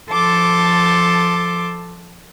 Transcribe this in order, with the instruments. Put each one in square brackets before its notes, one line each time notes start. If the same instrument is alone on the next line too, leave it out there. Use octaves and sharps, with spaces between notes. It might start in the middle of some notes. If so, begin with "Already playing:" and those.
[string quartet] F3 A4 A5 C6 D6